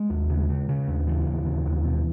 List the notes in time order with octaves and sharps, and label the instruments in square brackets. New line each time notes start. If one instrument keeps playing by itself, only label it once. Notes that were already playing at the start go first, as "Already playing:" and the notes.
Already playing: [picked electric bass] G#3
D#2
C#3
C#3
C#3
D#2
C#3 E3
D#2
C#3
D#2
B2